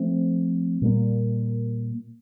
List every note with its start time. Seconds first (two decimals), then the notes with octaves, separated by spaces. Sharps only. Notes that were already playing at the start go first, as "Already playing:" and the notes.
Already playing: F3 A3 C4
0.82 A#2 G3 A#3